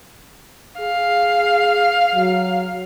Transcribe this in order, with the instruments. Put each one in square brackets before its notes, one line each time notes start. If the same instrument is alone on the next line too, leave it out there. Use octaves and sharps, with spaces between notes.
[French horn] G#4 [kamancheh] F5
[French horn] F#3